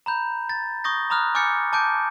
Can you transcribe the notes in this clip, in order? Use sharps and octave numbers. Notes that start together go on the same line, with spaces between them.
A#5 B5 G6
A6
C#6 D#6 G6 A#6
A#5 B5 D#6 F6 F#6
G#5 D6 F6 G6 A6 C#7
A5 D6 G6 D7